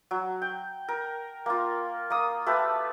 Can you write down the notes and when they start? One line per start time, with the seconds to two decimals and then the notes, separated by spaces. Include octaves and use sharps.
0.11 F#3
0.42 G5
0.89 A#4
1.46 A#3 F4
2.10 A#3 D#6
2.46 A3 G4 B4